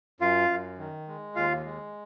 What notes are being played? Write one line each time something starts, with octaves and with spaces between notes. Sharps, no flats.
F#2 F4 F5
F#2
D#3
G#3
D#2 F4 F5
G#3